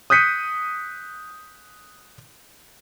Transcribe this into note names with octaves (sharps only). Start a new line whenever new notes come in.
D#6 F#6 G6 B6 C#7 D#7